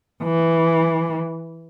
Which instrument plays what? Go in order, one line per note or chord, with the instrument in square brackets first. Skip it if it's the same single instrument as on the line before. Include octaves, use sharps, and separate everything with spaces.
[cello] E3